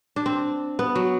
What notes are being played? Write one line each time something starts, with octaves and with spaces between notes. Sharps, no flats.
D4
C4
B3
F#3